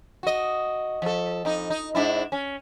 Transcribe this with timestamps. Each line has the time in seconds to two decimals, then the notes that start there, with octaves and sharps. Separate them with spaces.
0.23 F#4 D#5
1.02 F3 A4
1.45 F2 D#4
1.70 D#4
1.95 G#2 D4 E4
2.32 C#4